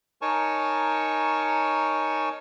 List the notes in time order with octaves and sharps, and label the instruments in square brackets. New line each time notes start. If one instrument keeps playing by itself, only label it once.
[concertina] D#4 A#4 C#5 G#5 A5 C#6